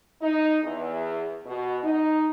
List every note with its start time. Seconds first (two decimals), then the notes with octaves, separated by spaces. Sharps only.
0.22 D#4
0.63 E2
1.46 B2
1.82 D#4